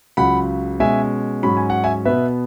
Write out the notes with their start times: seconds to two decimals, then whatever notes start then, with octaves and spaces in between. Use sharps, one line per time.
0.17 C#2 C#3 F#3 F#5 B5
0.80 B2 G#3 C#4 E5 G#5
1.43 G#2 F#3 C#4 B5
1.57 G#5
1.70 F#5
1.84 E5 G#5
2.05 B2 B3 B4 E5